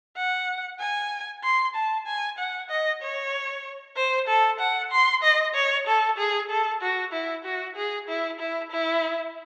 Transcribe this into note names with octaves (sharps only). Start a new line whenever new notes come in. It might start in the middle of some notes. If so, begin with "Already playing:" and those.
F#5
G#5
C6
A5
G#5
F#5
D#5
C#5
C5
A4
F#5
C6
D#5
C#5
A4
G#4
A4
F#4
E4
F#4
G#4
E4
E4
E4